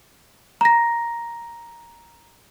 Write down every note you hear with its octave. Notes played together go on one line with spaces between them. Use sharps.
A#5 A#6